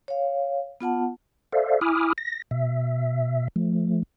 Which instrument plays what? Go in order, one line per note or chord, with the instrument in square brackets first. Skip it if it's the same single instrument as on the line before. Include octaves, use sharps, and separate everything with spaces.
[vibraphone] C#5 F5
B3 F4 F#5 A5
[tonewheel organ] A4 C5 D5 E5 F5
E4 G#5 B5 D6 D#6 F6
A#6
B2 E5
F3 A3